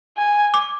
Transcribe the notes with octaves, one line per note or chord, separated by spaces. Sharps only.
G#5
D6